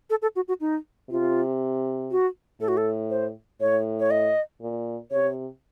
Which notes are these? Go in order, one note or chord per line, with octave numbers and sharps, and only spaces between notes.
A4
A4
F#4
F#4
D#4
C3 F4
F#4
A2 A4
F#4
A4
C5
A2 C#5
C#5
D#5
A#2
C3 C#5